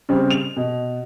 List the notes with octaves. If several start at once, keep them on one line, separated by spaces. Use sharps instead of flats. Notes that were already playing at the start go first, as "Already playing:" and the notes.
C#3 G3 C4
F7
B2